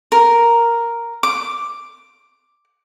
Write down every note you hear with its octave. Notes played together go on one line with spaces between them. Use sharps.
A#4
D6